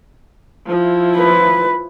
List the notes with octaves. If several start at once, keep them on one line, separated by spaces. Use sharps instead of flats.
F3 E4
B4